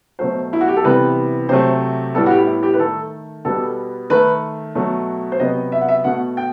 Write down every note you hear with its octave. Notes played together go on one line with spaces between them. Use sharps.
B2 F#3 A3 C5
E4
F#4
G4
A4
C3 E3 G3 B3 B4
C3 F#3 A3 C5
A2 G3 B3 A4
F#4
G4
E4
G4
B4
D#3 A3 A4
B2 G3 B3 A4
D#3 A3 B4
B2 F#3 A3
C5
C3 F#3 B3 D#5
E5
F#5
E5
B2 A3 F#5
G5